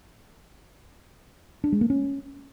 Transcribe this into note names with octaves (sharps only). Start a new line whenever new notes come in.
D4
G#3
A#3
C#4